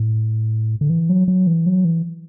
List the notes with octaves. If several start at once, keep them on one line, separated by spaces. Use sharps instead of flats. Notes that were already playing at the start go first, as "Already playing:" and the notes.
Already playing: A2
D3
E3
F#3
F#3
E3
F#3
E3